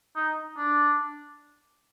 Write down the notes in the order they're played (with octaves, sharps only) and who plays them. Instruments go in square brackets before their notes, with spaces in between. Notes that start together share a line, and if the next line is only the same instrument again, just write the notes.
[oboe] D#4
D4